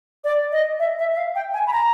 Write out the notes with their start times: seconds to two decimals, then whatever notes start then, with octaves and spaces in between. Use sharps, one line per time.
0.24 D5
0.52 D#5
0.79 E5
0.99 E5
1.12 E5
1.17 F5
1.35 G5
1.54 G#5
1.67 B5
1.73 A#5